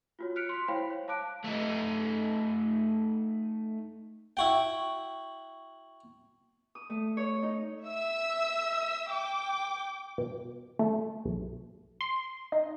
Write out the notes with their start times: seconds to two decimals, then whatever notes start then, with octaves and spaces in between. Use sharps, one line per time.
0.19 F4 F#4 C#5
0.36 F6 F#6 B6 C#7 D7 F7
0.49 C6 B6
0.68 E4 C5 C#5 F5 G5 B5
0.90 C#5
1.08 F5 A5 D6 F#6 D7
1.44 A3 D#4
4.37 E4 F#4 G5
6.75 D#6
6.90 A3
7.17 C#5
7.42 D#4
7.83 E5 E6
9.09 G5 D6
10.18 B2
10.79 A3
11.25 B1
12.01 C6
12.52 D#4